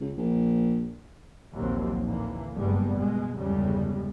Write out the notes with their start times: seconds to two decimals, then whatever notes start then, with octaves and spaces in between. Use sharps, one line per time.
0.01 C#2
0.17 A#1
1.54 A#1 D#2 F#3 C4
2.03 A2 D3 E3 A#3
2.56 F#1 G2 G3 G#3 B3
2.97 B2 G#3
3.39 G1 E2 C#3 G3 G#3